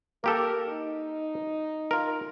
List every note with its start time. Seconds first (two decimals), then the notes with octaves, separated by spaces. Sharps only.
0.24 A#3 G4 A4 A#4
0.69 D#4
1.91 F4 A#4